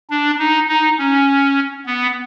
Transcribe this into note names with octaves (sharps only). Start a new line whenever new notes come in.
D4
D#4
D#4
C#4
B3